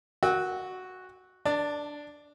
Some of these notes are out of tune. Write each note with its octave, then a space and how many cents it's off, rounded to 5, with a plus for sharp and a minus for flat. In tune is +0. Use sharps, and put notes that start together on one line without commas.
F#4 +0 G5 +35 E6 -25
D4 +0 A5 +30